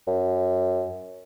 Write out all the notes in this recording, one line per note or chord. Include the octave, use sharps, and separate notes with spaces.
F#2